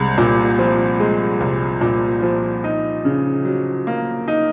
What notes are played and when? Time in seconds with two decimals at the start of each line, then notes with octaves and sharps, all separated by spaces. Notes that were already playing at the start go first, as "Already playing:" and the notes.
Already playing: C2 G#3
0.18 A#2
0.59 F3
1.00 G#3
1.40 C2
1.81 A#2
2.22 F3
2.64 D#4
3.05 C#3
3.45 F#3
3.87 A#3
4.28 D#4